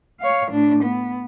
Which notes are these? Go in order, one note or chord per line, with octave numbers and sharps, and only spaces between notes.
C#5 F5
A2 D4
B3